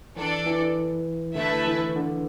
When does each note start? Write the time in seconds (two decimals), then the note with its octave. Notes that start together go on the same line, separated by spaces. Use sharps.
0.16 E3 D4 A4 D5
0.46 E3
1.35 D3 A3 E4 B4 E5 A5
1.65 E3
1.96 D3